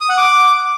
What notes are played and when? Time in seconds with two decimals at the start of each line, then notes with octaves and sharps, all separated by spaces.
0.01 D#6
0.09 F#5
0.18 D6